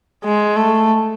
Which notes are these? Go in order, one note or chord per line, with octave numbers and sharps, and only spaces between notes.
G#3
A3